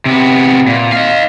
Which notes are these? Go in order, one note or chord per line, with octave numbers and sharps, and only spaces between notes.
C3 B3
A#2
D#5 F5